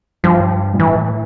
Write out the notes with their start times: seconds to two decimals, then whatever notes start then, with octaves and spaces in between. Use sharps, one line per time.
0.24 G2 F3
0.74 A#2
0.79 A2 E3